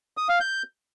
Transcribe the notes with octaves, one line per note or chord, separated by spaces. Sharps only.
D#6
F5
G6